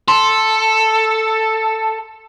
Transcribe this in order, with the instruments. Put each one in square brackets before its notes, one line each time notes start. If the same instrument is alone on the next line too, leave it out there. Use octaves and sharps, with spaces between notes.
[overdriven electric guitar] A4 [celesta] C6